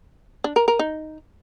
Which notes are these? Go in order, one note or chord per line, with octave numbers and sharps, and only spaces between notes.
D4
A#4
A#4
D#4